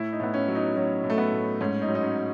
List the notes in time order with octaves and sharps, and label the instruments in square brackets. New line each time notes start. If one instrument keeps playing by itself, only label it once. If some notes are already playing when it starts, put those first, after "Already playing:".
Already playing: [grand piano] A2 E4
D#4
A2 B3
C#4
F#3
D#4
F#3 C#4
A2
A3
B3
A2
G#2 C#4
D#4
F#3
D#4
C#4